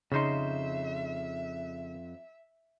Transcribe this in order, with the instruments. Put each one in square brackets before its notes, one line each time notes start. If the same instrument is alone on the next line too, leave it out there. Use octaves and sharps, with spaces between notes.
[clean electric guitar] F2 C5 C6 [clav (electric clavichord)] C#3 D#4 [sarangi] E5